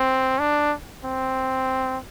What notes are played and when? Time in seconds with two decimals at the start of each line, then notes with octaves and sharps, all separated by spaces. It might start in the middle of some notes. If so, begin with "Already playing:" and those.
Already playing: C4
0.40 D4
1.04 C4